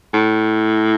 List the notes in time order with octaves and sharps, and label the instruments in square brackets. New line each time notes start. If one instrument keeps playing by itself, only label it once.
[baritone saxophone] A2